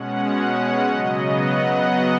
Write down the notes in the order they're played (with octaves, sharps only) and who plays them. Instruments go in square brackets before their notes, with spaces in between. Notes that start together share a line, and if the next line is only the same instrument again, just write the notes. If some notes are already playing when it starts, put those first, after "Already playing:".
Already playing: [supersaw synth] B2 G#3 C#4 F#5
F#5
C#3 F#3 B3 D#5
F#5